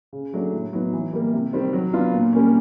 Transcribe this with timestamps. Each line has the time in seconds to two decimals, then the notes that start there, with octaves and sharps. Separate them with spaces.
0.13 C#3
0.33 F#3 A3 D4
0.53 A2
0.73 F#3 B3 D#4
0.93 E3
1.13 G3 A#3
1.33 C3
1.53 D#3 G3 C4
1.73 F#3
1.93 B3 D4 F4
2.13 A#2
2.33 G3 A#3 C#4